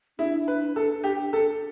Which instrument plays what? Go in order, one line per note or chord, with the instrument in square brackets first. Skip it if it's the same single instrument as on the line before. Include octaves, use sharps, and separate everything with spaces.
[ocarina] D4 [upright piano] E4
[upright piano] B4
A4
G4
A4